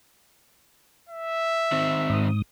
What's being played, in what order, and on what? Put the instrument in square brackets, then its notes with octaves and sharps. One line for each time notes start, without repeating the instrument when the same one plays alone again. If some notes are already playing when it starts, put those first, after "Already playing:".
[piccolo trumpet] E5
[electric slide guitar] D#3 C4
[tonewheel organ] G#2 D#6